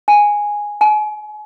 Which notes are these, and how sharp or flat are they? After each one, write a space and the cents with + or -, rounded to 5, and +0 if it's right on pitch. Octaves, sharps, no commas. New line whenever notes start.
G#5 -5
G#5 +35